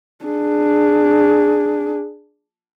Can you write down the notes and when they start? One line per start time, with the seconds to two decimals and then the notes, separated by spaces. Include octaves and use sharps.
0.25 D4 G#4